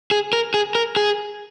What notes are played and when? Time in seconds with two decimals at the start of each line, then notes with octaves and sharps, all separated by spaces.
0.11 G#4
0.33 A#4
0.54 G#4
0.75 A#4
0.96 G#4